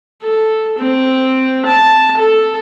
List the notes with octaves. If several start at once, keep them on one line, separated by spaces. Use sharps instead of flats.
A4
C4
A5
A4